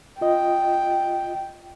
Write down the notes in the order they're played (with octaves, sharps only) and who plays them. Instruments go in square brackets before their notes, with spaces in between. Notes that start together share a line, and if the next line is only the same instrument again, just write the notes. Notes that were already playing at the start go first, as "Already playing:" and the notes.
[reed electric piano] F4 D#5 [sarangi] G5